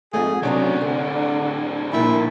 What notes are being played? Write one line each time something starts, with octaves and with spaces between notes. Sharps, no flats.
F2 G#2 A3 G#4
A2 C3 F#3 B3 C#4 D4
D3 C4
A#2 F3 E4